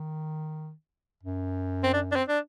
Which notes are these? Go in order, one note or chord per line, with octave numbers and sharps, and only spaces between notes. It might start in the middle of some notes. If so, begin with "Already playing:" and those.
Already playing: D#3
F#2
C4
D4
D4
C4
D4